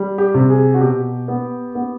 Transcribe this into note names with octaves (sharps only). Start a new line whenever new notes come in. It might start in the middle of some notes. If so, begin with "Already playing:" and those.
Already playing: G3
G4
C3
G#4
F#4
B2 G4
B3
B3